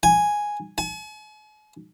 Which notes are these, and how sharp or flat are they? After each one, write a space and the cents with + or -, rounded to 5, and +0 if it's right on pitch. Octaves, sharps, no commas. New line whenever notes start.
G#5 +0
G#5 +45